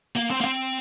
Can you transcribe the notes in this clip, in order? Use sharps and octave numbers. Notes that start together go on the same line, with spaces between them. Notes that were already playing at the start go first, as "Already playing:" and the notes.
A#3
C4
A#3
C4